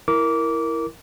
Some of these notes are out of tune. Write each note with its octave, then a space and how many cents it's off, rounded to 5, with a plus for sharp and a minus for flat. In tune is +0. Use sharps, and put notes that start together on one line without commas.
E4 +0 A#4 +0 D6 -20